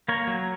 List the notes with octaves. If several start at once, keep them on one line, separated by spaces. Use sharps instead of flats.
A#3 A#4 C#5
F#3